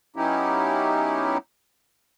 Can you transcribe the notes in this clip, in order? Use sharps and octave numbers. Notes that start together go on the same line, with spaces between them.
F#3 B3 C#4 D#4 E4 G4